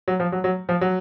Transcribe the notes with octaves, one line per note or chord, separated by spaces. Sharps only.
F#3
F3
F#3
F#3
F3
F#3